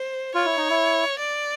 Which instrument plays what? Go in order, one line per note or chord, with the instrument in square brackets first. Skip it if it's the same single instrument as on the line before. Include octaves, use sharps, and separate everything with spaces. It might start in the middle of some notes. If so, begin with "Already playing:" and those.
Already playing: [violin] C5
[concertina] F4 [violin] C#5
[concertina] E4
D#4
E4
[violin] D5